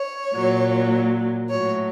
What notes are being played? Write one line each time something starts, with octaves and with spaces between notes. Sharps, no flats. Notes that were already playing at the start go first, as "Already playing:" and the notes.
Already playing: C#5
A#2 F#3
A2 F#3 C#5